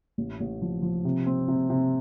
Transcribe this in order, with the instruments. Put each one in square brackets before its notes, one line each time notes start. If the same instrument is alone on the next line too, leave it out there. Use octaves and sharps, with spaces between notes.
[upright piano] A1
A1
F3
F3
C3
C4
C3
C3